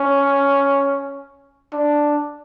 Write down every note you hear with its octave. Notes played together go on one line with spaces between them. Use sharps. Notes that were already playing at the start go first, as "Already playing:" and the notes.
Already playing: C#4
D4